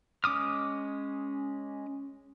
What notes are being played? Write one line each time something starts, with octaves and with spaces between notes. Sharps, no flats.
G#3 C#4 D6 D#6 F6